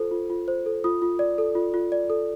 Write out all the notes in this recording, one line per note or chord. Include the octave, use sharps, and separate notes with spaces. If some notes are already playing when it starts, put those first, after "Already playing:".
Already playing: F4 A4 C5
F4
F4
C5
A4
F4 D#6
F4
D5
A4
F4
F4
D5
A4